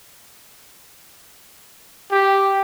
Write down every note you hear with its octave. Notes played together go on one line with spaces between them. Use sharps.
G4